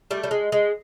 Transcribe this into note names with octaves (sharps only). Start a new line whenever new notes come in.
G3 A3
G3
G#3
G#3